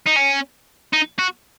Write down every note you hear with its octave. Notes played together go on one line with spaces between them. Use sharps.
D#4
C#4
D#4
F#4